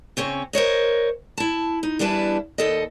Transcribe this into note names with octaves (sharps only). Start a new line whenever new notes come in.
C#3 C4 C#4 C#5
A#4 C5 C#5 D#5
E4 A5
D#4
E2 G3 D4 E4 B4 A5
D#2 A4 D#5